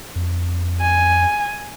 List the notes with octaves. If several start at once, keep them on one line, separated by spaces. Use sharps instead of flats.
F2
G#5